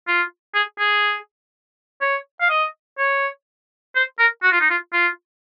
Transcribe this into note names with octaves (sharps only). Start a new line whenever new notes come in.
F4
G#4
G#4
C#5
F5
D#5
C#5
C5
A#4
F#4
F4
D#4
F4
F4